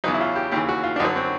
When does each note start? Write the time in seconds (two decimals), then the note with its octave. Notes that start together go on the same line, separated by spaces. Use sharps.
0.04 E2 C#3 F#3 D#4
0.14 E4
0.21 F4
0.35 G4
0.52 D#2 C#3 E3 G4
0.69 F#4
0.84 F4
0.96 D4
1.00 F#2 D3 F#3 D#4
1.16 C4